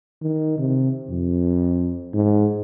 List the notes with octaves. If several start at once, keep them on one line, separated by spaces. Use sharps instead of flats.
D#3
C3
F2
G#2